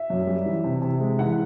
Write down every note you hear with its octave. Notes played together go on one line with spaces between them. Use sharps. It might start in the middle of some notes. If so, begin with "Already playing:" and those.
Already playing: E5
F#2
G3
E3
C3
C3
G#3
E3 F#5